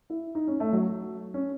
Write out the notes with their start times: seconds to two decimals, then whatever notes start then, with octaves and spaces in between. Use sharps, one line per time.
0.10 E4
0.35 D#4
0.48 C#4
0.60 A3
0.73 F#3
1.34 C#4